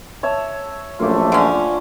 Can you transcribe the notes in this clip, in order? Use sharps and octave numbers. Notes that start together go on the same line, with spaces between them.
C#5 E5 A5
A#1 F#2 A3 F4 D6
D3 C#4